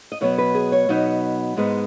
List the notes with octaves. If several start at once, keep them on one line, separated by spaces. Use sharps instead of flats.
D#5
B2 F#3 B3 C#5
B4
G#4
C#5
B2 F#3 B3 D#4
G#2 G#3 B3 D#4